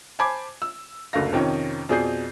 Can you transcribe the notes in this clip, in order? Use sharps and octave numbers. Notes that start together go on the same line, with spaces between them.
C5 G#5 A5 B5 D6 G#6
E6
F#1 D2 A4 F5 A#6
F2 C3 D#3 C#4 C#5 G5
F2 B2 G#4 D5 G6 C7